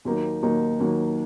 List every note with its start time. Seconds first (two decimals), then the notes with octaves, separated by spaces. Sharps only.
0.05 D#2 D#3 F#3 A#3 D#4
0.42 D#2 D#3 F#3 A#3 D#4
0.80 D#2 D#3 F#3 A#3 D#4